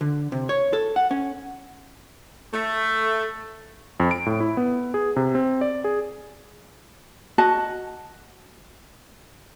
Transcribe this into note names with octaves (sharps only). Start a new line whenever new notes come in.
D3
C3
C#5
A4
F#5
C#4
A3
F2
D7
A2
E4
B3
G#4
C3
C4
D5
G#4
F#4 D#5 A5